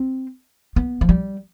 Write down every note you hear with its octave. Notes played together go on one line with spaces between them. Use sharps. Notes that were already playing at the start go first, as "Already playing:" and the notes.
Already playing: C4
B3
F3
G3